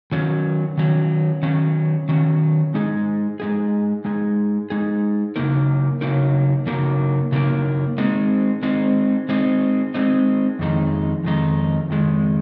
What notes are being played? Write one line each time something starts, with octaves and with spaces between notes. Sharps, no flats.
D#3 F#3 C#4
D#3 F#3 C#4
D#3 F#3 C#4
D#3 F#3 C#4
G#3 D#4 G#4
G#3 D#4 G#4
G#3 D#4 G#4
G#3 D#4 G#4
C#3 F#3 A#3 D#4 A#4
C#3 F#3 A#3 D#4 A#4
C#3 F#3 A#3 D#4 A#4
C#3 F#3 A#3 D#4 A#4
G#3 C4 D#4
G#3 C4 D#4
G#3 C4 D#4
G#3 C4 D#4
F2 D#3 G#3 D#4
F2 D#3 G#3 D#4
F2 D#3 G#3 D#4